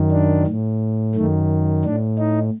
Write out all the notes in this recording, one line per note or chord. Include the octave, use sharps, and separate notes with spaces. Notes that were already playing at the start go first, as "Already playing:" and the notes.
Already playing: F#2 D#3
D4
A2
F#2 D#3 A3
A2 D4
D#4